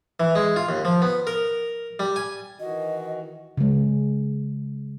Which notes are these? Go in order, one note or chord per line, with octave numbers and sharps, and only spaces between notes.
E3
G#3
F4
D#2
F3
B3
A#4
G3
G#5
D#3 E3 F#4 D#5
C#3 G#3